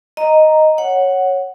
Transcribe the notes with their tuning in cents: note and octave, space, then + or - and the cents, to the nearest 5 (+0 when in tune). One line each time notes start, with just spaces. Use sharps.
D#5 +0 A#5 +0
C#5 -5 F#5 +0